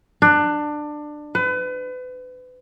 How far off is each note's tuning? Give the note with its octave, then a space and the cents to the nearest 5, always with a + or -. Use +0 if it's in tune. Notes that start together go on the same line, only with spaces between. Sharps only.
D4 +20
B4 +35